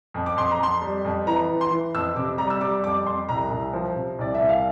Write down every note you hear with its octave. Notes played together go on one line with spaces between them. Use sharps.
F2
D6
F2 C6
A#5
F2 C6
G3
F2
E3 A#5
E3
C6
E3
F2 E6
C3 D6
G3 A#5
E6
G3 D6
F2 D6
F2 C6
C2 A#5
C2
F3
C3
C2 D5
E5
C2
F5